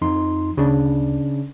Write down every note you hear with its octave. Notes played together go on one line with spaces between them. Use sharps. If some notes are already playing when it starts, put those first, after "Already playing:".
F2 D#4 C6
D2 C#3 D4